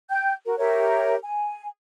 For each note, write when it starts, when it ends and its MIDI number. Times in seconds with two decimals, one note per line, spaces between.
0.09 0.32 79
0.09 0.32 91
0.45 0.54 66
0.45 0.54 70
0.58 1.15 67
0.58 1.15 70
0.58 1.15 73
0.58 1.15 76
1.22 1.66 80